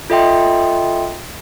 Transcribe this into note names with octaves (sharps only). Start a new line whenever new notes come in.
F4 A4 D#5 E5 G5 C6